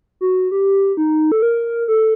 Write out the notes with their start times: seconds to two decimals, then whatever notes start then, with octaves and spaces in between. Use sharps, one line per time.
0.21 F#4
0.51 G4
0.97 D#4
1.32 A4
1.42 A#4
1.88 A4